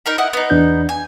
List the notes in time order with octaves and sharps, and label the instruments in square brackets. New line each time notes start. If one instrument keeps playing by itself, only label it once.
[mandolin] D#4 A#4 B5
E4 D#5 F#5
B3 D#4
[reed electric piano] E2 D4 G6
[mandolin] G#5